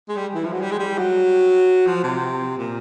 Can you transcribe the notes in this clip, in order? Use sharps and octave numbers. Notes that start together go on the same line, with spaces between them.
G#3
G3
E3
F3
F#3
G3
G#3
G3
F#3
F3
C3
A#2